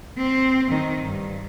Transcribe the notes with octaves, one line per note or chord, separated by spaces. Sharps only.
C4
D#3
G2